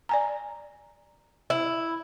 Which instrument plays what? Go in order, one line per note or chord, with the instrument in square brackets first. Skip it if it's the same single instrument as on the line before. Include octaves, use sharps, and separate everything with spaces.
[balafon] D5 G#5 A#5
[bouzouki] E4